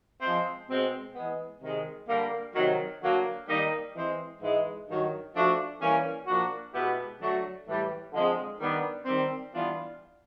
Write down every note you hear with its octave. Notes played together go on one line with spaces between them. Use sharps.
F3 G#3 C4
B2 G#3 C4
E3 G#3 B3
C3 D#3 G#3
D3 G3 A#3
C3 D#3 F#3
D3 F#3 A#3
D#3 G3 A#3 D#4
E3 G#3 C4
G#2 E3 G#3
G2 D#3 F#3
F3 A3 D4 F#4
E3 G3 A#3 C#4
A#2 F3 A#3 D4 F#4
B2 G#3 B3 E4 G4
D3 F#3 A3 D4 F#4
A2 E3 G3
D3 F3 G#3 C4
D#3 G3 B3 D4
D#3 G3 C4
E3 G3 B3 D4 F4